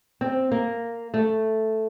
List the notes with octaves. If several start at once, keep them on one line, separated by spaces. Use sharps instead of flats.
C4
A#3
A3